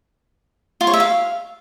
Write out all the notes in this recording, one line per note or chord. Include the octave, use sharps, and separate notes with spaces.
F4
C#5
E5
F5